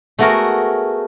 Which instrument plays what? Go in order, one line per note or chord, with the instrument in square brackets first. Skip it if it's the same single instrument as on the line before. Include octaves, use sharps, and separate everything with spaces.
[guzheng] A3 B3 F#4 G#4 A#4